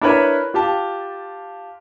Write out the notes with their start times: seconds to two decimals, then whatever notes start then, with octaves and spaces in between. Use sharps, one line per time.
0.01 D4 E4 A#4 B4 C#5
0.54 F4 G4 A5